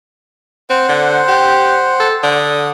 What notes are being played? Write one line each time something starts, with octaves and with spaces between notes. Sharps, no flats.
C4 C5 F#5
D3
G4
A4
D3 D#6